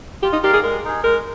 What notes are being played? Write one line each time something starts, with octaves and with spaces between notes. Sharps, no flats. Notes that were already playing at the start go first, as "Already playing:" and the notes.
F4 G4
D#4
G4 A#4 D5 F5
G#4
G#3 A#4
D#4 G#4
G#3 A#4